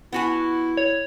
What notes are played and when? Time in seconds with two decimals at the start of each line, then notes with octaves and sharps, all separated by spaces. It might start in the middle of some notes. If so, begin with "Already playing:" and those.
0.12 B3 E4 F#4 G#5
0.77 C#5